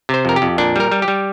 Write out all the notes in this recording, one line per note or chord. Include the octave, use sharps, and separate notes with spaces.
C3 C5
F2 A#4
G4
F2
A#2 D4
G3 A#4
G3
G4
G3